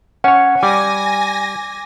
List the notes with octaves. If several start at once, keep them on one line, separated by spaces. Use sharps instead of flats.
C#4 C#5 F#5
G3 G#5 D6 A#6